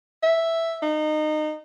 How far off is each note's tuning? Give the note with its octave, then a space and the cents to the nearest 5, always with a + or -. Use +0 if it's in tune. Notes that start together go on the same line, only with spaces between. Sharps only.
E5 +0
D#4 -25